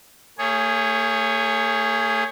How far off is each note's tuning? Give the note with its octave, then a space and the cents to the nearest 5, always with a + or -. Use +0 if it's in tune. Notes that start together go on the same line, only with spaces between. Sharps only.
A3 +45 G#4 -5 C#5 +5